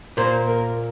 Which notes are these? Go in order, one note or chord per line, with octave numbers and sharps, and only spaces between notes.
A#2 A#3 C5
A#4